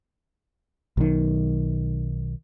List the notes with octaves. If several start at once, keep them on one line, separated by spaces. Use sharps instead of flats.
B1 D#3